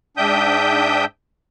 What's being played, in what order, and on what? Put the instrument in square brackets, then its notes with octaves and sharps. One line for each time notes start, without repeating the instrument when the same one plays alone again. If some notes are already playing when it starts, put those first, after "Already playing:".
[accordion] G#2 D4 E5 G5 D#6 G6